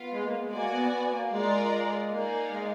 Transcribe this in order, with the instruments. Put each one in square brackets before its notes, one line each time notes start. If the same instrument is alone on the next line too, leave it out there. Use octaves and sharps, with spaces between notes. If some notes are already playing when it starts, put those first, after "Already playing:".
Already playing: [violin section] B3 F4 B4 F5
[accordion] G#3
A#3
G#3
[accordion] A#3 [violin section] F#4 D5 G#5
[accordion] B3
B3
A#3
[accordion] G#3 [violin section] F4 A#4 D5
[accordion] G#3
[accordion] A#3 [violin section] D#4 A#4 D5 F5 G#5
[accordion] G#3